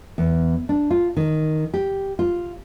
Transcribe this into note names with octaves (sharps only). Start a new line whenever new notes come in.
E2
D4
F4
D#3
G4
F4